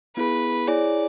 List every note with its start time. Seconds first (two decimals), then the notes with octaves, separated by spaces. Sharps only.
0.17 B3 E4 G#4 B4
0.67 E4 G#4 C#5 D5 G#5